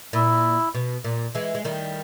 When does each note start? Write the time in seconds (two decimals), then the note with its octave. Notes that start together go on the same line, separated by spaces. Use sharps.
0.13 A#2 E4
0.75 B2
1.04 A#2
1.35 E3 G#3
1.55 G#3
1.64 D#3 G3